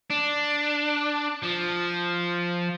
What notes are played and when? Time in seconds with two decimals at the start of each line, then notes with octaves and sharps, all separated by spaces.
0.10 D4
1.43 F3